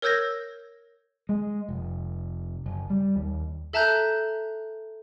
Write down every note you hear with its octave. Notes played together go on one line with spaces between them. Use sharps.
A#4 C#5 E6 G6 G#6 A#6
G#3
F1
F#1
G3
D#2
A4 E5 A5 A#5 F#6 G6